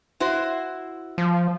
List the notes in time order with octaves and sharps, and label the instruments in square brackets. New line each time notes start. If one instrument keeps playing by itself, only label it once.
[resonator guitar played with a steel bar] E4 F#4 C5
[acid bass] F3